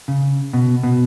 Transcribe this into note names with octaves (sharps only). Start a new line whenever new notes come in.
C#3
B2
B2